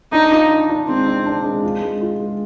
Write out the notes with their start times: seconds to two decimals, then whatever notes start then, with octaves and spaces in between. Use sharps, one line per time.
0.12 D4 D#4
0.31 F4
0.51 D4
0.69 D4
0.88 G#3 C4
1.07 D4
1.26 D4
1.44 G#3
1.63 F4
1.82 G#3
2.01 F4
2.20 G#3